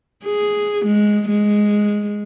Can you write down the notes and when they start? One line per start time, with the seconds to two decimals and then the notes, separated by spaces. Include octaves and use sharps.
0.25 G#4
0.86 G#3
1.29 G#3